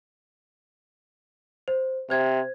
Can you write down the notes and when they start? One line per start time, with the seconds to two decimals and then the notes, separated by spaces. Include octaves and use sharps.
1.68 C5
2.10 C3 C5 G#6